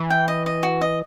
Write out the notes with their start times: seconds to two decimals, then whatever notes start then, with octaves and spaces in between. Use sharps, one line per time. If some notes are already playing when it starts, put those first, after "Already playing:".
Already playing: E3
0.10 G5
0.28 D#5
0.46 D#5
0.63 F#4
0.81 D#5